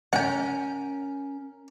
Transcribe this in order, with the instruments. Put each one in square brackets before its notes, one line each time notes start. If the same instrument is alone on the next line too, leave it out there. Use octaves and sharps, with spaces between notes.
[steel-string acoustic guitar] C#4 A#4 [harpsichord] F#5 G5